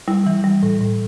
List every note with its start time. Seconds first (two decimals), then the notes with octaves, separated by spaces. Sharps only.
0.08 G3 E4
0.27 E3
0.44 G3
0.63 A2
0.81 A2